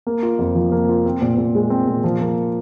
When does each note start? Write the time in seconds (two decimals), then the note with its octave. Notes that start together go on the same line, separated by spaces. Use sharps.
0.07 A#3
0.23 F4
0.39 F2
0.55 F3
0.72 A#3
0.89 F4
1.05 C4
1.22 A#2
1.37 A#2
1.55 G#3
1.70 C4
1.88 A#2
2.04 F3
2.20 A#3